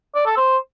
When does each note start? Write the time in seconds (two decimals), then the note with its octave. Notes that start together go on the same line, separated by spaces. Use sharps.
0.15 D5
0.26 A4
0.37 C5